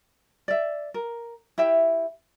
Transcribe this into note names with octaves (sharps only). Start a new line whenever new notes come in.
D5 E5
A#4
E4 G4 E5 G5